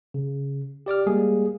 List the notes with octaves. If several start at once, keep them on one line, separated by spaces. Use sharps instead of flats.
C#3
G4 D5 D6 F6
G3 G#3 A#3 G#4